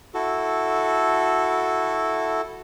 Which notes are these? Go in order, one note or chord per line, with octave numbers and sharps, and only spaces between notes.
E4 F#4 A4